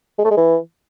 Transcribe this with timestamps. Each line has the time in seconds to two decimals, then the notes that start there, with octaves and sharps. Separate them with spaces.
0.18 G#3
0.24 A3
0.31 G#3
0.37 E3